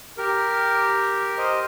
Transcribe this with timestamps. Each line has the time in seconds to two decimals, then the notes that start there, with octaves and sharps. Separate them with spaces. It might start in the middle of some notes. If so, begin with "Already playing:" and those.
0.18 G4 A#4
1.37 C5 D#5